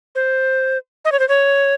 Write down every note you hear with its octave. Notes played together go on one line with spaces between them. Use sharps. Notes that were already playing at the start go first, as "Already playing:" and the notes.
C5
D#5
C#5
C5
C#5